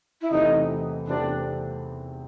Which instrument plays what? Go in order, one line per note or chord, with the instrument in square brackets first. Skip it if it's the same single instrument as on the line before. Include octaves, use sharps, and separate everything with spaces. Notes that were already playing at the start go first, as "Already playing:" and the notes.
[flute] E4
[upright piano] E2 C3 E3 A3 C4 [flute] D#4
[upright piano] E2 C3 E3 A3 C4 [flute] D4